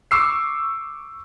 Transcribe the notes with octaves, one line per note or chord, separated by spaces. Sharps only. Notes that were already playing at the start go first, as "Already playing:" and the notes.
C#6 D6 E6 C7